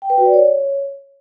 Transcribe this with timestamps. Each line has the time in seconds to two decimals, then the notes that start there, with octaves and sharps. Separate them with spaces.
0.02 G5
0.10 B4
0.18 F#4
0.26 D5
0.33 C#5